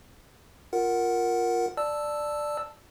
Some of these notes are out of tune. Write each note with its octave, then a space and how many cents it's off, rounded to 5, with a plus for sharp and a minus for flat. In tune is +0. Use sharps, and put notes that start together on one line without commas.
F4 +5 A#4 +0 F#5 +0
D5 +10 A5 +0 E6 +0